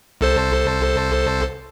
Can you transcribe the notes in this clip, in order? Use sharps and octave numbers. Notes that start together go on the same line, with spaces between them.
C2 A4 C5